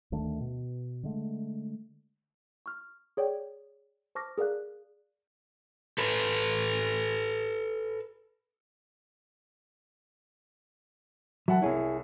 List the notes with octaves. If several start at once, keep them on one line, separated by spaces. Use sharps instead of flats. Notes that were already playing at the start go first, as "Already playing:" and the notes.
D2 D#3 A3 D4
B2
D3 G#3 A3
C#6 F6
G#4 C#5 D5 G5
C5 A5 C#6 D6 F6 A#6
G#4 A#4 D5 F5 F#6
A4 B4
F#3 E5 F#5 A5
C2 E4 G#4 C#5